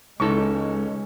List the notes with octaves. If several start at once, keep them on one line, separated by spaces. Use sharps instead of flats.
C#2 G#3 C#4 D#4 A4 C#6